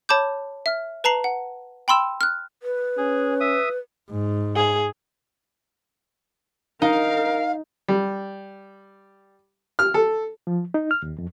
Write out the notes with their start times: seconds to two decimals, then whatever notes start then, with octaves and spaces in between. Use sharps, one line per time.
0.09 C#5 A5 B5 D6 G6
0.66 E5 F6
1.04 B4 A5 A#5 C7 F#7
1.24 F#5
1.88 G5 B5 C6 E6 E7
2.21 F6 F#6
2.63 B4
2.98 C#4 G#4
3.41 E5 D#6
4.10 G#2
4.56 G#4
6.82 D#4 A#4 F5
7.88 G3
9.79 F6
9.94 A4
10.47 F3
10.74 D#4
10.91 F6
11.02 D#2
11.18 F2